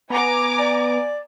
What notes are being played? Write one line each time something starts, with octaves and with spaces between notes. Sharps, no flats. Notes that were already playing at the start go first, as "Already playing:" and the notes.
B3 G#5 A#5 D6
D5